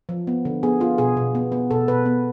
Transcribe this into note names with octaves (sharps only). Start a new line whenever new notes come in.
F3
B3
D3
B3 G#4
B3 F4
B2 G#4
B2
B3
B3
B2 A4
B2 B4
B3